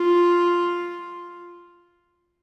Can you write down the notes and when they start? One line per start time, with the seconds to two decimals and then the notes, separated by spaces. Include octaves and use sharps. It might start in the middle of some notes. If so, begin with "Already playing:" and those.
Already playing: F4